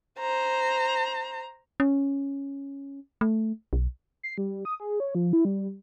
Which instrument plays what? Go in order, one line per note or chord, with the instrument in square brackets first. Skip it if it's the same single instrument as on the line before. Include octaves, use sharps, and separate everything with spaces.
[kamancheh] C5 A#5
[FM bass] C#4
A3
B1
[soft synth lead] C7
G3
D#6
G#4
C#5
F3
E4
G3